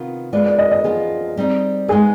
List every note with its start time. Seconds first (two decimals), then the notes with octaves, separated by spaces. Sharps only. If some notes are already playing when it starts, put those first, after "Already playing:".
Already playing: C3 D#3 B3 F4
0.33 G#3 B3 F4 B4 D5
0.46 D5
0.59 D#5
0.72 D#5
0.84 F3 B3 F4 G#4
1.37 G3 C4 D#4
1.88 G#3 B3 D#4 G#4 B4